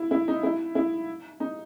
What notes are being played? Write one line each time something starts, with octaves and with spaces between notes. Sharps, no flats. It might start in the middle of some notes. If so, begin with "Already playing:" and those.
Already playing: E4
E4
D#4
E4
E4
D#4